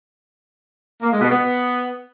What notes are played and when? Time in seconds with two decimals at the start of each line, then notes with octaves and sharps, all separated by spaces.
1.02 A#3
1.12 G#3
1.21 B2
1.31 B3